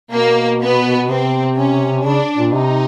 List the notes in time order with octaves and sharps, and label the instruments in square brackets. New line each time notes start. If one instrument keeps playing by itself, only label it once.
[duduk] B2 [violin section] A#3
[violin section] B3
[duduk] C3 [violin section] C4
[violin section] C#4
[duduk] C#3 [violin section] D4
[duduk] A#2
[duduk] C3 [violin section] D#4